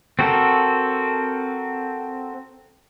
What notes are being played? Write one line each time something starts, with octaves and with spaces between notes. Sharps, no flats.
C4 F#4 A4 A#4